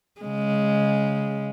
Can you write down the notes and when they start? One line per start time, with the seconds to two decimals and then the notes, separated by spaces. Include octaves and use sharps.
0.21 C#3 G#3